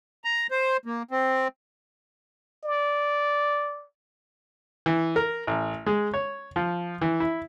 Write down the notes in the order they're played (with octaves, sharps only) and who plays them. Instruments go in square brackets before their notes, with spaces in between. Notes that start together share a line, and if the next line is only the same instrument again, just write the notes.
[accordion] A#5
C5
A#3
C4
[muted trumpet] D5
[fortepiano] E3
A#4
A1
G#3
C#5
F3
E3
E4